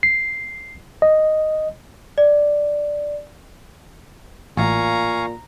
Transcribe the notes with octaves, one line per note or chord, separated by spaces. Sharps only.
C7
D#5
D5
A1 A#2 F5 G#5 A#5 C#6